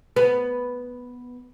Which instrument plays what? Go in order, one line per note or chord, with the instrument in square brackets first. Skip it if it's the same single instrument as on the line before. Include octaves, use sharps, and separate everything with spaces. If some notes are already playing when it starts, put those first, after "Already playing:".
[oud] B3